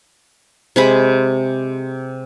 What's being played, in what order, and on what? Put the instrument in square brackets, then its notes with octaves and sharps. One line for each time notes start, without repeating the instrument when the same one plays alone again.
[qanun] C3 G#3 B5